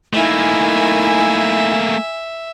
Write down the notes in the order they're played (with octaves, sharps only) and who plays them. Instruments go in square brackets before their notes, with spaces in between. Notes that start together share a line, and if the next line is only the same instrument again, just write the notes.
[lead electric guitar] A3 A#3 [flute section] D#4 E4 A#4 [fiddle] E5 [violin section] G#5